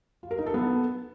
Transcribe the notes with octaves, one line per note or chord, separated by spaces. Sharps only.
F4
A#4
D#4
A4
B3